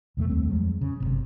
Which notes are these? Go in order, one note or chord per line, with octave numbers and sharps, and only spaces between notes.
C2 F2 G#3 A3
D#2 G3 A3 C4
F2 F3 F#3 G#3
C#3
G1 C2 C3